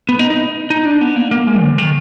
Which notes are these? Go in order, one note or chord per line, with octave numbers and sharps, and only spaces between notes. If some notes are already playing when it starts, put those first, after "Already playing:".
B3
D#4
D#4
D#4
D4
B3
A#3
A#3
G#3
D3
D#3